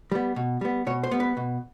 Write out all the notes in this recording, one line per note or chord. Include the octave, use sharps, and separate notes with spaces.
G3 B3
B2
G3 B3
B2 C#5
C5
G3 B3
B4
B2